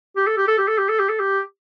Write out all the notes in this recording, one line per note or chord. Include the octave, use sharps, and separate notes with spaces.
G4
A4
G4
A4
G4
A4
G4
A4
G4
A4
G4